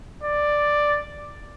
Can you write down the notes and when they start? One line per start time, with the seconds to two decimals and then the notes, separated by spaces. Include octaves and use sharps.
0.23 D5